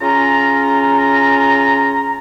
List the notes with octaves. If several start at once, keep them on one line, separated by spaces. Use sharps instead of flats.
C#3 C#4 F4 A#5